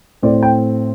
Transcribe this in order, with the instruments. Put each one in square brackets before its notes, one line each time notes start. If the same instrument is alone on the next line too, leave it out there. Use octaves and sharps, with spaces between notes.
[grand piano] A2 A3 C4 D5
G5